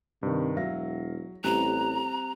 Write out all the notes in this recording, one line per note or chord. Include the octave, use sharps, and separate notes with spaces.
G2 C3 D#3
E1 F#3 E5 F5 A#6
A1 G3 C4 A#5 F#6